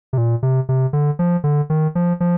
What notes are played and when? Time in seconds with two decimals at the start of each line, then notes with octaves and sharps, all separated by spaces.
0.13 C3
0.18 A#2
0.43 C3
0.69 C3
0.93 D3
1.19 F3
1.44 D3
1.70 D#3
1.95 F3
2.20 F3